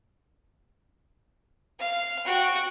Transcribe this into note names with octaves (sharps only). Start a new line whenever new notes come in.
F5
F#4 G5